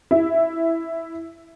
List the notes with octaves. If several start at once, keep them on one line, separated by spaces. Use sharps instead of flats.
E4